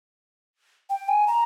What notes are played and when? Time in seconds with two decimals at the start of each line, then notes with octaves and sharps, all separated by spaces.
0.90 G5
1.08 G#5
1.27 A#5